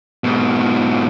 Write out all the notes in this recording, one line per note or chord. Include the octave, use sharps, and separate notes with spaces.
G#2 B2